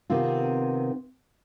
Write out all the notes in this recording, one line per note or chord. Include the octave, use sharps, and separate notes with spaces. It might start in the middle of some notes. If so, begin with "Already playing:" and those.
C3 D#3 B3 C4 F4